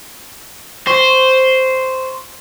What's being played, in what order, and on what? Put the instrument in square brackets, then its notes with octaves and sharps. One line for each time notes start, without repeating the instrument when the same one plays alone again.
[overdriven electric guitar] C5 [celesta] C#6